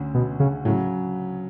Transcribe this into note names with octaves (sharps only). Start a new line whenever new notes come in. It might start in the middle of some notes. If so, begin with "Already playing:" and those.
Already playing: D2 D3 C#4
B2
C#3
A2 C#3 F#3